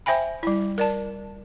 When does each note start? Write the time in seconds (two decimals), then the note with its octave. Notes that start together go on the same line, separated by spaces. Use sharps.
0.06 C5 E5 G5 G#5 B5
0.43 G3 E4
0.78 A#4 D5 A5